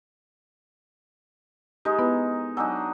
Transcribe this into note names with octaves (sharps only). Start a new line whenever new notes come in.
G#3 D#4 G4 A#4 D#6
B3 E4 B4
F#3 D4 D#4 G#5 E6